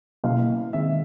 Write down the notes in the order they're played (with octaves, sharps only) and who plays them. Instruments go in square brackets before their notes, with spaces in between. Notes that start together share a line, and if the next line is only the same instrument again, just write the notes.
[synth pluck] B2 F#3 A#3 C#4 E4 [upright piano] F5
[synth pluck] D#3 G#3 C4 [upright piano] E5